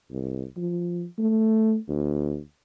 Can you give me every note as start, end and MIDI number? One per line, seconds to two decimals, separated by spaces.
0.12 0.44 36
0.57 1.05 53
1.19 1.77 57
1.89 2.39 38